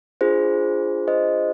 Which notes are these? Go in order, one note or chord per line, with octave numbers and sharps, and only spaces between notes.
D4 F4 G#4 C5
C5 D#5